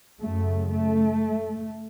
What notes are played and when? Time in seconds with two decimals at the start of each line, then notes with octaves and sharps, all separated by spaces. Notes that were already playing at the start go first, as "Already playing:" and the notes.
0.19 F#2 C#3 A3
0.71 A3